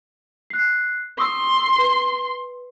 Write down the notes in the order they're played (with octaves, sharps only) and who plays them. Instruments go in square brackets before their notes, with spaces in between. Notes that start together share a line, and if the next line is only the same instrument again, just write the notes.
[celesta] F#6 C7
[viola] C6 [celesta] C#6 D#6 E6
[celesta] B4